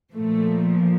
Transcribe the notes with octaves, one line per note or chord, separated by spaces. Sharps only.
A#2 F3 A3